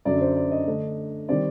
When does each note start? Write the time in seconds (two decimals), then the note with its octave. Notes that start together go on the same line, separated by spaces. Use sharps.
0.05 F#2 D3 F#3 D5
0.21 C5
0.36 D5
0.51 D#5
0.67 D3 A3 D4
1.29 D#3 G3 C4 D5